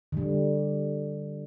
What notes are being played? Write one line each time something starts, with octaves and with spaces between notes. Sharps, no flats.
D3 G3